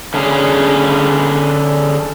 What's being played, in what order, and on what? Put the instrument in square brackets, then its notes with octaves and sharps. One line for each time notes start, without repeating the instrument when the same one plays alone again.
[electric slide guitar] D3 C#4 G#4